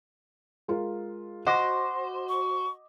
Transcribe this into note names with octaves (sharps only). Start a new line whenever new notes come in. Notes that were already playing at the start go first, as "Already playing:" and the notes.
G#3 F4 A#4
F#4 C5 D#5 D6 A#6
C#6